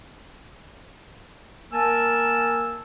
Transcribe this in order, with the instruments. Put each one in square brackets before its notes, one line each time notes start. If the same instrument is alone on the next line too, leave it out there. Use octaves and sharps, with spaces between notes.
[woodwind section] A#3 A#4 G#5 A5 E6